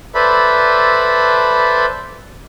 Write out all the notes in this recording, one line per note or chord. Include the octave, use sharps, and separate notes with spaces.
A4 B4 C5 D5 E5 B5